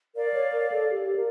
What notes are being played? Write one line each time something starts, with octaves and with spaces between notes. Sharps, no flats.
A#4 D5 F5
C#5
A#4
A4
G4
A#4